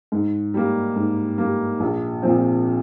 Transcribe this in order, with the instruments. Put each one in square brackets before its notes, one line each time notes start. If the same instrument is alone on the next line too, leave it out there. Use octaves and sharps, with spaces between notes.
[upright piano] G#2
G3 A#3
G#2
G3 A#3
A#1
A#2 F3 C4